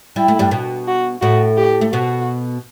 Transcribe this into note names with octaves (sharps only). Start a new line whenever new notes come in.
G3 E4
A3
G2 G3
B2 B3
F#4
A2 A3 F#4
G4
A3
B2 B3 F#4